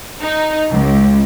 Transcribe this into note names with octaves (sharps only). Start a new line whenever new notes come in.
D#4
C#2